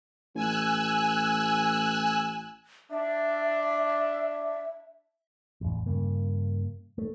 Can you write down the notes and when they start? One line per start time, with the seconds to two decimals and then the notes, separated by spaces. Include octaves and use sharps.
0.35 A1 G#5 E6 F#6
2.91 D4 E5
5.61 A1 E2
5.86 G2 C#3 A#3
6.98 A3